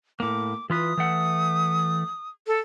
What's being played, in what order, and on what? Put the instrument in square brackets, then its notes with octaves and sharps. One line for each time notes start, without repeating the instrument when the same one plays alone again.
[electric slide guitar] A2 A#3 [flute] D6
[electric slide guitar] E3 F4 B4 [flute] D#6
[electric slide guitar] E3 A3 F#5
[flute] A4